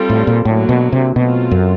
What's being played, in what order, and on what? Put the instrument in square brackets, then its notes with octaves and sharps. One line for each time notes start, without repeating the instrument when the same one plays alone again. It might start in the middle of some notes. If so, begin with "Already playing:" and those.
Already playing: [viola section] G3 C4 F4 A4
[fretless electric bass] A2
A#2
[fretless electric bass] A2 [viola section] D3 F#3 A#3
[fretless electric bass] B2
C3
[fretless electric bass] B2 [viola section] F#3 A3 C4 F4
[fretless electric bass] F#2